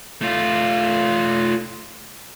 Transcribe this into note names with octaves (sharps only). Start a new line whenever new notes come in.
A3 F4